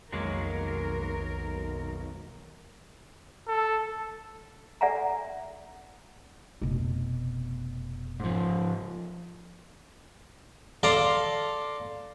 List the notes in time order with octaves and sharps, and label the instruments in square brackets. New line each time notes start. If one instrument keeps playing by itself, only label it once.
[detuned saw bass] B1 [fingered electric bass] F2 D#3 [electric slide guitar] F#3 G#3 A#3 [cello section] A#4
[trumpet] A4
[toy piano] A4 D5 E5 F#5 G#5 A#5
[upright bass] F1 B2
[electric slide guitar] G#2 F3
[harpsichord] A4 D5 F5 A#5 C6 D6